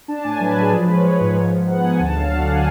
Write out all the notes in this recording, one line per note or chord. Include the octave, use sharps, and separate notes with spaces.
D4 A5
A2 G#5
F#3 B4
F#3
G#4
F3 G#4
B4
G#3
C#5
G#3
G#2
F3
G#2
B3 F#5
G#2 G#5
D2 A5
F#3 F5
D3 F#5
G#5